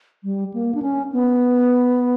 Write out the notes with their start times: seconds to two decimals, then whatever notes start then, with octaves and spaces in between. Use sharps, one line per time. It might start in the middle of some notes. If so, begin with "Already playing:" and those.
0.24 G3
0.54 A#3
0.75 D4
0.82 C#4
1.12 B3